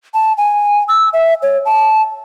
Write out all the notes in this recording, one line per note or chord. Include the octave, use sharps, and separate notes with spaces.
A5
G#5
E6
E5
C#5
A5